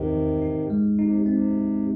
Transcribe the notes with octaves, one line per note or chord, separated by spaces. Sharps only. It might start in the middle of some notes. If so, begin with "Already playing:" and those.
Already playing: E2 C3 D#3
E3
D#4
G#3
C3 D#4
C3 C4